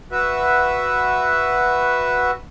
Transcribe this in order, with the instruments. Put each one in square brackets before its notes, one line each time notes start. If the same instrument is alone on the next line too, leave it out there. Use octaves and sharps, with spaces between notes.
[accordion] F#4 B4 E5